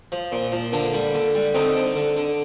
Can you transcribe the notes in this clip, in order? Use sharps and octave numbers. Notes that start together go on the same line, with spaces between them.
F3
A#2
F3
D3 A#3 D4
G3
D3
G3
D3 C4 D#4
D3
D3
D3